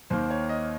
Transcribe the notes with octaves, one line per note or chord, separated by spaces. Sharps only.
D#2 D#3 A#3 C5
C#5
D#5